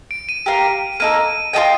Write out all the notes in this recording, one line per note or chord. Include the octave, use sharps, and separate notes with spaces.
D7
D#7
G4 A#4 F5
A#3 D#4 A4 D#7
F4 A4 D#5 G5 D#7